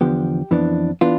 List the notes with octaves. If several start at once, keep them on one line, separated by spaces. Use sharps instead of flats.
E2 D3 F3 B3 G4
F2 E3 B3 D4
E3 B3 D4 F4